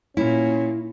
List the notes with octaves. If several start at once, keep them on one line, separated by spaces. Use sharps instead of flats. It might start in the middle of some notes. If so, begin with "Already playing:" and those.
A#2 C#4 E4